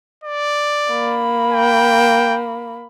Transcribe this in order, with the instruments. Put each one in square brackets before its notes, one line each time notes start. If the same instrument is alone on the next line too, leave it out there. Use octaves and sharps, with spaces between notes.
[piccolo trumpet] D5
[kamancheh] A#3 B5
[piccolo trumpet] G5